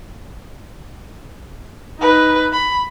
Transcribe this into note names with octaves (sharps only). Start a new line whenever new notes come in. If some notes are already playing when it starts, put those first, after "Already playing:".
D#4 B4
B5